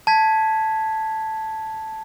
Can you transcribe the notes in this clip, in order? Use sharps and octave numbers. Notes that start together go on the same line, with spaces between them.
A5 G#6 B6